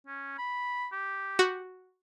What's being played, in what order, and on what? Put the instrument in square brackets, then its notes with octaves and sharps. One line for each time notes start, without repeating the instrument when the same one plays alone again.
[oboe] C#4
B5
G4
[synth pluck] F#4